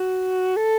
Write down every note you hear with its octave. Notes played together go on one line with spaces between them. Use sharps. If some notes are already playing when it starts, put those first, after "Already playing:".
Already playing: F#4
A4